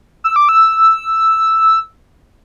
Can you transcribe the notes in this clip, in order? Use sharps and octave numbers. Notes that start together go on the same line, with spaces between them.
E6
D6
E6